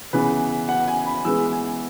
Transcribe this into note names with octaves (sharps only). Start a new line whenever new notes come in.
C#3 E3 B3 B4
F#5
G#5
B5
E3 G#3 B3 E6
G#5